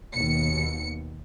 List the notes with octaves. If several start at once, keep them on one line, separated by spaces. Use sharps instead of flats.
D#2 B2 C#7